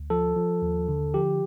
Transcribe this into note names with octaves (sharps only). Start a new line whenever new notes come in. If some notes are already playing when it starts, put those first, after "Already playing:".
Already playing: D2
F3 A4
F3
D#2
D3
F3 G4